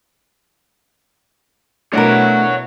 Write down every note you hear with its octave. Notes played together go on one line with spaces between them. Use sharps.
B2 A3 D4 E4 A#4 C#5 F#5